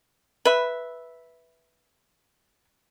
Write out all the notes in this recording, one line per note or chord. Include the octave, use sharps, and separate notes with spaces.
B4 E5